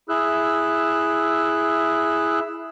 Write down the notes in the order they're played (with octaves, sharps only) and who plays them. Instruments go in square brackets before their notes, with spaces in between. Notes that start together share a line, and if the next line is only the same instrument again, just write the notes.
[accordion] E4 G#4 E6 F#6